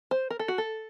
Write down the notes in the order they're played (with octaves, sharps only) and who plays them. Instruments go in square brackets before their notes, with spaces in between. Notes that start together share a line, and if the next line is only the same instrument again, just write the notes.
[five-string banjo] C5
A#4
A4
F#4
A4